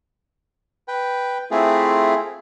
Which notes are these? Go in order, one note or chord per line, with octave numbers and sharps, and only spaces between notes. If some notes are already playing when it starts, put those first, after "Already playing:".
B4 G5
A3 C4 E4 F4 G#4